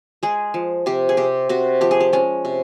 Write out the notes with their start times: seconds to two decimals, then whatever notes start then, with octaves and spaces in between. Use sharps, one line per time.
0.23 G#3 G#4
0.54 F3
0.86 C3 G4
1.09 G#4
1.17 C3 G4
1.49 C3 F#4
1.81 F3 G4
1.91 G#4
2.00 G4
2.13 G#3 C#4
2.45 C3